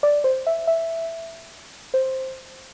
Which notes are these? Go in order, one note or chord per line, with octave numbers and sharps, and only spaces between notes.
D5
C5
E5
E5
C5